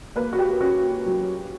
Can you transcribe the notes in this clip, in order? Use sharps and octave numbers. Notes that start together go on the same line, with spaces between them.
A#3 B4
F#4
G4
C#4 F#4
F#3